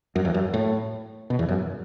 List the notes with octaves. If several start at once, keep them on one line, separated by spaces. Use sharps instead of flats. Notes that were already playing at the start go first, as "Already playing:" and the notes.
F#2
E2
F#2
A2
B2
E2
F#2